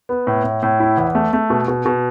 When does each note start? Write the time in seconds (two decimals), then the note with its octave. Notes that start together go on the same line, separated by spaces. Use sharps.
0.09 B3
0.27 A2
0.44 A2
0.63 A2
0.80 E4
0.97 E2
1.15 A3
1.33 A3
1.50 B2
1.68 B2
1.86 B2